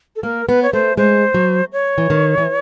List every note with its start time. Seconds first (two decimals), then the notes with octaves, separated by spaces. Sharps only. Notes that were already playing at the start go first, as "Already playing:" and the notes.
0.16 A4
0.23 A#3 A#4
0.48 B3 B4
0.63 C#5
0.73 A3 C5
0.97 G#3 C5
1.34 F#3
1.73 C#5
1.98 E3
2.10 D#3
2.38 E3